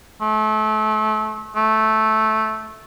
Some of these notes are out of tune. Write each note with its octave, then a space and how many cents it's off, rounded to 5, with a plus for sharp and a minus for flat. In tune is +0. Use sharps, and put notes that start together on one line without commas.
A3 -30
A3 -10